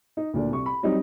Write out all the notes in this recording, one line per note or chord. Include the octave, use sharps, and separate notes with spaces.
D#4
D2 A#2 D4
C2 C#6
B5
F#3 G3 C4 D#4